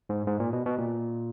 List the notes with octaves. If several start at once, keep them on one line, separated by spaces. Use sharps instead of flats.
G#2
G#2
A#2
B2
B2
A#2